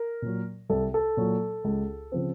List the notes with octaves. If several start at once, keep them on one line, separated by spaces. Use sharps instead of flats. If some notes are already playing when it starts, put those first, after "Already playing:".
Already playing: A#4
A#2 F#3
C2 A4
A4
A#2 F#3
C#2
C#3 F3 C4